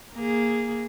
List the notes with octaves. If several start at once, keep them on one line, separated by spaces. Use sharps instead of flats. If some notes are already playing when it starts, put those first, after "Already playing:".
A#3 G#4